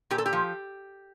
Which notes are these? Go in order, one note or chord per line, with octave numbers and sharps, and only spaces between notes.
A#2 G4
A4
G4
F3